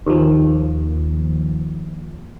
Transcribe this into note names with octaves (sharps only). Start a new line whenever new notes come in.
D#2 F3